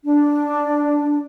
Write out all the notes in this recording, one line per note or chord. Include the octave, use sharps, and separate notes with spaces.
D4